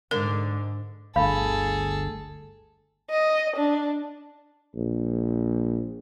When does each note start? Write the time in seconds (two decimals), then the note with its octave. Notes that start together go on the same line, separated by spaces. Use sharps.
0.11 G#2 D3 A#4
1.16 G1 D2 G#4 A4 F5 B5
3.10 D#5
3.56 D4
4.75 A#1